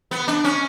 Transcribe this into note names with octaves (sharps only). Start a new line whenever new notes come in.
B3
D4
C#4